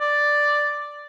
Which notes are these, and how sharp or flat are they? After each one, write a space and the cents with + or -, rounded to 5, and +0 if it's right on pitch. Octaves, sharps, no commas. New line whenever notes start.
D5 +0